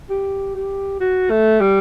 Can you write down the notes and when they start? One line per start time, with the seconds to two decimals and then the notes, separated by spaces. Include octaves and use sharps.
0.10 G4
0.55 G4
1.00 F#4
1.30 A3
1.61 G3